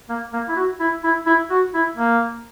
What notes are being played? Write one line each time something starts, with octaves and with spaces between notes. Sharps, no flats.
A#3
A#3
E4
F#4
E4
E4
E4
F#4
E4
A#3